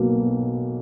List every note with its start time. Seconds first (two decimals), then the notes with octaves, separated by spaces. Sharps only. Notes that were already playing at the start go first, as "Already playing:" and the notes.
Already playing: B1 B2 F#3 A#3